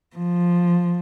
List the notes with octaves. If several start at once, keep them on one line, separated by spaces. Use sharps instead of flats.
F3